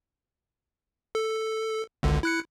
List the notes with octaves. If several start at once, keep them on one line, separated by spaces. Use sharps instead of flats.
A4
G#1 C#2 D3
E4 F#6 C#7